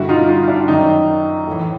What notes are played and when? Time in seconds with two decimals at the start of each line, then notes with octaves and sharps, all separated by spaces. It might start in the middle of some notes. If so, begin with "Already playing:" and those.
Already playing: G2 D3 E4 F#4
0.09 D#4 F4
0.28 D#4 F4
0.48 D4 E4
0.68 F#2 D#3 D#4
1.47 A2 E3